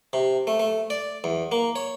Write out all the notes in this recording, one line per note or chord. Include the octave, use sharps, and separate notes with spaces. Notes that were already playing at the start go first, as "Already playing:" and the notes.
C3
A3
A3
D5
E2
A#3
C#5